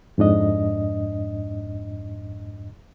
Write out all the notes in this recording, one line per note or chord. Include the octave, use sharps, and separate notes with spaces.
F2 G#2 D4 D#5